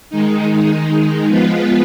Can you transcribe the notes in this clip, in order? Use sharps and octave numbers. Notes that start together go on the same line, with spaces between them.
D#3 G#3 D#4
F3 G#3 B3 F4 B4